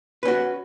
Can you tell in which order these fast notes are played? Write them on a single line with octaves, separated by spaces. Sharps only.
B4 C#4 F#4